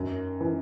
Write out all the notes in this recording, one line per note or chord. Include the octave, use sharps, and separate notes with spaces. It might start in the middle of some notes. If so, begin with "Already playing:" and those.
Already playing: F#2 D#3
E3